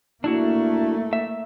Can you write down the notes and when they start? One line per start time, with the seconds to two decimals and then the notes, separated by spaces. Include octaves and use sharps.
0.24 A3 A#3 D4 E4 F#4
1.13 E5